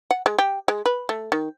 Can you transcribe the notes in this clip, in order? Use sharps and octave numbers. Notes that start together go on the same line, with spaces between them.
F#5
G#3
G4
G#3
B4
A3
D#3